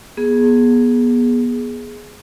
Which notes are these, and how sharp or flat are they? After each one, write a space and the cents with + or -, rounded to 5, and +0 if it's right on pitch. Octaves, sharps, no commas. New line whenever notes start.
B3 -30 G#4 +0